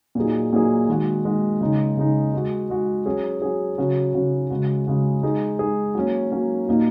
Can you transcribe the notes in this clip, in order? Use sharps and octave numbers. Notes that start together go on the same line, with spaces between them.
A#2 F#3 D#4 G#4
A#2 F#3 D#4 G#4
D#3 G#3 F#4
D#3 G#3 F#4
C#3 G#3 D#4
C#3 G#3 D#4
G#3 F#4
G#3 F#4
F#3 C#4 G#4
F#3 C#4 G#4
C#3 F#3 C#4 F#4
C#3 F#3 C#4 F#4
C#3 G#3 F#4
C#3 G#3 F#4
G#3 D#4 G#4
G#3 D#4 G#4
F#3 A#3 C#4
F#3 A#3 C#4
A#2 A#3 D#4 F#4